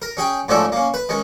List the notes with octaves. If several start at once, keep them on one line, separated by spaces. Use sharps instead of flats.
A#4
C#4 G#4 G5
G#2 F3 A3 C#4 D4 E5
A#3 C#4
B4
D#3 G#3 C#4